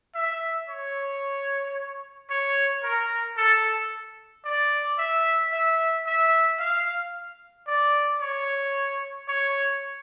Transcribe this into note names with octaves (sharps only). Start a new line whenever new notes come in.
E5
C#5
C#5
A#4
A4
D5
E5
E5
E5
F5
D5
C#5
C#5